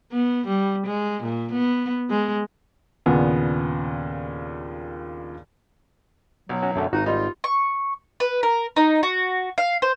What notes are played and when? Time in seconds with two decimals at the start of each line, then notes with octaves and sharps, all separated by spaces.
0.12 B3
0.47 G3
0.87 G#3
1.23 A#2
1.52 B3
2.10 G#3
3.06 D#2 A#2 C#3 B3 D4 G#5
6.49 B1 F#3
6.62 C#4 F#4
6.76 F#2 D3 A3
6.93 G#1 D#4 F#4
7.06 G3 D#4 F4
7.44 C#6
8.20 B4
8.43 A#4
8.76 D#4
9.03 F#4
9.58 F5
9.82 C5